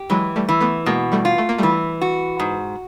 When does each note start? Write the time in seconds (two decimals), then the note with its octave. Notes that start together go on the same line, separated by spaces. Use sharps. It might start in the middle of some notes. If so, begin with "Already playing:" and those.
Already playing: G4
0.10 E3 F#3 G#3
0.36 G3 A3
0.48 E3
0.61 A3 B3
0.86 B2 G#3 A#3
1.12 G3 A3
1.25 F4
1.38 A3
1.49 A#3
1.58 E3 G3 A3
2.01 F#4
2.40 G#2